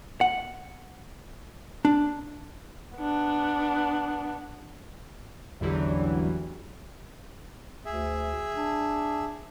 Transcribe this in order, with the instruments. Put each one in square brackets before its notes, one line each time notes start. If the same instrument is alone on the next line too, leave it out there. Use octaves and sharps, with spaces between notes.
[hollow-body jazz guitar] F#5
D4
[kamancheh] B3 D4
[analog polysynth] A1 E2 D3 E3 F#3 G3
[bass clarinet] D2 [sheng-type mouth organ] G#4 E5
[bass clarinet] D4